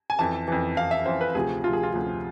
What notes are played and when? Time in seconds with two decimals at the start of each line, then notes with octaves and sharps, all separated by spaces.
0.10 G#5
0.19 F2 E3 A5
0.48 F2 E3
0.77 F2 E3 F5
0.91 E5
1.05 F2 E3 C5
1.21 B4
1.35 D2 C3 F3 G#4
1.64 D2 C3 F3 F4
1.73 G#4
1.83 F4
1.93 D2 C3 F3